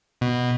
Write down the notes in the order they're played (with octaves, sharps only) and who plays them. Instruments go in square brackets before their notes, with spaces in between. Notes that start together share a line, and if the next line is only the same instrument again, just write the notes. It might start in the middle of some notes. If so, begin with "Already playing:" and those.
[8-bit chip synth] B2